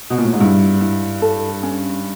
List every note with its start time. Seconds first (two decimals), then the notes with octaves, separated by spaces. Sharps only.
0.10 B2
0.18 A#2
0.25 A2
0.33 G#2
0.40 G2 E4
0.81 E4
1.22 A4
1.63 C#4